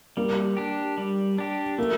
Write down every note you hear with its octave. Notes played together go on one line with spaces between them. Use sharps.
G3 A#3
D4 G4
G3
D4 G4
A3 A#3